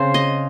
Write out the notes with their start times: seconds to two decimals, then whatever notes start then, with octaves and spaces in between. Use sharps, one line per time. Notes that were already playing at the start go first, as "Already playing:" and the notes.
Already playing: C#3 C4 C5
0.14 D#5